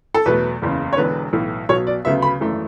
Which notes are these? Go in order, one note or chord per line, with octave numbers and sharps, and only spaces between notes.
A4
E2 B2 F#3 A3 B4
F#1 E2 C#3
C#5
E1 E2 D3 B4
B1 A2 E3
B1 B2 F#3 C#5
D5
D2 C#3 F#3 B3 E5
B5
G#1 F#2 E3 A3